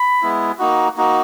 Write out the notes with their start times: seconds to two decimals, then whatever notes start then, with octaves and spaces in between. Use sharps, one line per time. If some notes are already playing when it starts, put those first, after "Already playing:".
Already playing: B5
0.22 G#3 B3 E4
0.59 A#3 D#4 F#4
0.97 A#3 D#4 F#4